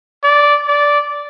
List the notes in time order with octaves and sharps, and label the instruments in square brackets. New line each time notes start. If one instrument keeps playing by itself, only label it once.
[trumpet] D5
D5